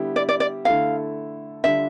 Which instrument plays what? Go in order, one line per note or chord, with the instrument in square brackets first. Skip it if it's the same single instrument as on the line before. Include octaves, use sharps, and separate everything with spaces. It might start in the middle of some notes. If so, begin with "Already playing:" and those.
Already playing: [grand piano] D3 G3 B3 E4 G4
[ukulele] D5
D5
D5
[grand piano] D3 A3 E4 A4 [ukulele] F5
[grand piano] D3 G3 D4 F4 [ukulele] E5